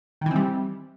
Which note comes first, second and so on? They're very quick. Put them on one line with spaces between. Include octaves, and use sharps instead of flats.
D#3 E3 C4 G3